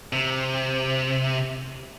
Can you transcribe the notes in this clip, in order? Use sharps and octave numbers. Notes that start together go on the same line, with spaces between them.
C3